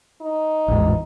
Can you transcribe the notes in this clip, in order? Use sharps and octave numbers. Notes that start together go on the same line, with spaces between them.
D#4
A1 E2 G#2